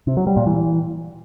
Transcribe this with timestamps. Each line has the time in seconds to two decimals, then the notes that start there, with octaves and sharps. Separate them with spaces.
0.07 C3
0.17 F#3
0.27 G3
0.37 A#2
0.46 E3